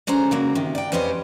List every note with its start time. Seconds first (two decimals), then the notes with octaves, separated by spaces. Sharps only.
0.07 D3 C#4 G#4 C5 A#5
0.31 C#3 F#3 A#3
0.55 C3 D#3
0.75 D5 G5
0.92 F2 B3 C#4 G4 C5 D#5